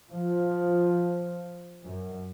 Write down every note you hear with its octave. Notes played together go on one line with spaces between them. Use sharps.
F3
F#2